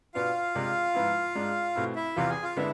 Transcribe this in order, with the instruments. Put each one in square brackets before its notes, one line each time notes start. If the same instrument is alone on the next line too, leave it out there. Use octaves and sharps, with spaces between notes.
[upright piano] B2 B3 D4 [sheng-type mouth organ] F4 F5
[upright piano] C3 G#3 D4
G#2 F3 B3 E4
G#2 G#3 D4
B2 A3 C4 E4
[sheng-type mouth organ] E4 E5
[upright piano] E2 C3 E3 [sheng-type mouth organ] F4 F5
[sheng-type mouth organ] G#4 G#5
F4 F5
[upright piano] D3 G#3 B3 D4 [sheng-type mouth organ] E4 E5